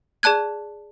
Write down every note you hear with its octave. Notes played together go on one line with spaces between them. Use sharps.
G#4 D5 A5 F#6 G#6